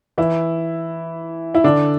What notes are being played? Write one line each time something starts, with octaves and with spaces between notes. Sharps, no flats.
E3 E4
E4
D3 D4